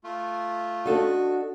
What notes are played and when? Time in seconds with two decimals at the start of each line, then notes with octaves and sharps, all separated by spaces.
0.04 A3 F4
0.86 D4 F#4 A4 D#5